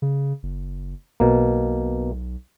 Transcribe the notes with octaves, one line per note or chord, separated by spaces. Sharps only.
C#3
F#1
B1 B2 A#3